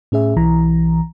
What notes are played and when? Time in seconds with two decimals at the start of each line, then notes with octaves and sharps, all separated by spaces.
0.12 A2 C#4 G#4 E5
0.36 B1 E3 A#5